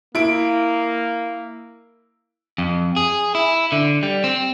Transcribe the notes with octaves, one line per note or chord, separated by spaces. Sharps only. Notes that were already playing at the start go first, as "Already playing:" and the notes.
A#3 E4 D7
F2
G#4
E4
D3
G3
C4